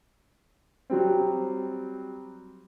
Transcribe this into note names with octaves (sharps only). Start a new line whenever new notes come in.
F#3 G3 C4